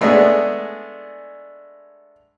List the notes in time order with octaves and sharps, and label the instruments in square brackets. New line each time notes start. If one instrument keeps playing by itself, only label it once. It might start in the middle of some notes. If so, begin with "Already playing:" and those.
[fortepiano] G#3 A3 B3 D4 G#4